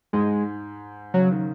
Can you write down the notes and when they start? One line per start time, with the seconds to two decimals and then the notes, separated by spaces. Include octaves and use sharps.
0.13 G#2 G#3
1.14 C#3 F#3
1.31 D#3